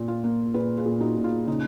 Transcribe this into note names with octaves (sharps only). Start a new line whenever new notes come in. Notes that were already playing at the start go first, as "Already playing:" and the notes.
Already playing: A#2
F4
A#3
A#2 G#4 B4
F4 G#4
A#2
D#4 F#4
A#2
F4
C#3 D#4